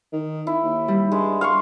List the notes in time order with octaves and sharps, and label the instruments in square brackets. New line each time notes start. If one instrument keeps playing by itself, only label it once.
[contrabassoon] D#3
[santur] E4
[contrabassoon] D#2
[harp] G3
[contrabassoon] G2 [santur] G#3
[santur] F5 C6 C#6